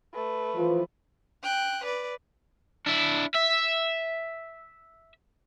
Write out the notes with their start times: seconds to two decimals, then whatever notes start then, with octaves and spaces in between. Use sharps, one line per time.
0.14 A3 B4
0.56 E3 F3
1.43 G5 F#6
1.84 B4 D5
2.87 D4 E4
3.35 E5